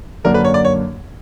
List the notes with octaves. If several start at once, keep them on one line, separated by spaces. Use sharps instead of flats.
F#2 D3 F#3 A#3 D4 A#4
B4
C#5
D5
C#5